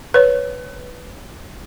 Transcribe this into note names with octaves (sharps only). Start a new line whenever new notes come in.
B4 C#5